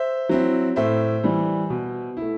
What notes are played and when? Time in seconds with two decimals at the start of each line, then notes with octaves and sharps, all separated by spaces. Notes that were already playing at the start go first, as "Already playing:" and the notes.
Already playing: C5 E5
0.29 F#3 C4 E4
0.76 A2 C5 E5
1.23 E3 G3
1.70 B2
2.17 A3 E4